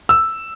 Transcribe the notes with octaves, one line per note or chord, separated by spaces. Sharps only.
E6